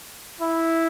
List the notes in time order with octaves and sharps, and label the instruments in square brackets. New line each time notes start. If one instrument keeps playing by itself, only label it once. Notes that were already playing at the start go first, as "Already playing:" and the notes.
[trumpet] E4